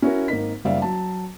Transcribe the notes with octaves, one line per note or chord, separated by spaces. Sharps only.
C#4 E4 F#4 A#4
G#1 A#3 D#4 B6
F#1 G3 D5 E5 F5
F#3 A5